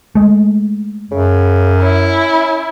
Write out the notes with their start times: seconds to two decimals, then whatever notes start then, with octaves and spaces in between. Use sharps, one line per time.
0.15 G#3 A3
1.11 F#2 C#3
1.82 C#4 E4